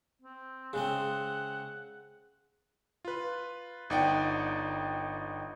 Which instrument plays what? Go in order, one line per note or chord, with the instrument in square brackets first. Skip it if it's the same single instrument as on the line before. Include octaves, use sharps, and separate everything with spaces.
[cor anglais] C4
[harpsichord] C#3 G#3 C4 [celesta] G#4 [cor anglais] F#5
[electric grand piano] F4 B4
G1 D#4 D5 F#5 G5